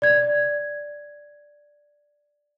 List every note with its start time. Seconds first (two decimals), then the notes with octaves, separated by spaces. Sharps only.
0.02 D5 G#6